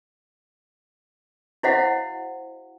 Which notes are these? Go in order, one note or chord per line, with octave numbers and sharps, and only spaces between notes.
E4 F#4 C5 D#5 F5 F#5